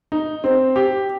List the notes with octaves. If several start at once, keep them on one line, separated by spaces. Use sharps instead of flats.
D#4
C4
G4